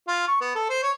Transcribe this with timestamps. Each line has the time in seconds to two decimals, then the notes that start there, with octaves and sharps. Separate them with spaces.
0.08 F4
0.27 C#6
0.41 B3
0.55 A4
0.69 C5
0.83 C#5